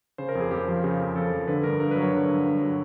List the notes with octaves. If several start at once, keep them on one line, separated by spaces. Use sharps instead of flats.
C#3 C5
A#4
F2
G#4
F2 G4
F3
C#3 G4
F2
F2 A4
F3
D3 B4
G2 A#4
G2 A#4
B4
F#3
C#5
D3
G2
G2
F#3